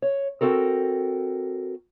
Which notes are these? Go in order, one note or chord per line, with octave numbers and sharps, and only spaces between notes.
C#5
C4 F#4 A4 A#4